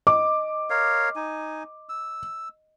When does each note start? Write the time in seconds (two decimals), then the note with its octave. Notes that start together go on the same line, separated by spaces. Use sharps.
0.07 D#5 D6
0.70 A#4 C#5 F5
1.16 D#4 G#5
1.89 E6